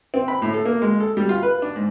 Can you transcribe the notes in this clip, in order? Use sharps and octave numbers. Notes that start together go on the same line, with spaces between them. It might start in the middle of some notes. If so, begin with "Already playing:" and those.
C4
B5
A2
A4
A#3
G#3
A4
G3
F4
B4
D4
G#2